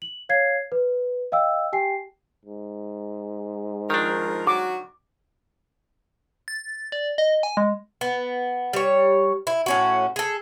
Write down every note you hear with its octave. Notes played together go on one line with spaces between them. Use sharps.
F#7
C#5 F5 G#6 C7
B4
D#5 F5 G5 E6
G4 G5 G#5 C7
G#2
D#3 F3 D4 A#4
F#3 F#4 D6
A6
D5
D#5
G#5
G#3
B3
G3 C#5
E4
A2 C#4 F#4
G#4 A4